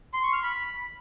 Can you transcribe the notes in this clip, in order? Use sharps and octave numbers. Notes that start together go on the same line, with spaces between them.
C6
C#6
F6
B5